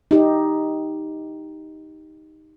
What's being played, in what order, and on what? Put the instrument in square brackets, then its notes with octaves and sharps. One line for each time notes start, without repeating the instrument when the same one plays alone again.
[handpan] D#4 G4